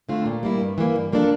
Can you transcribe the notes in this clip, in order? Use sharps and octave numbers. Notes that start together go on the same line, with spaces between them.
D3 A3 C4 F4
A#2
G3 A#3 E4
G2
E3 A#3
G2
F3 A#3 D4 A4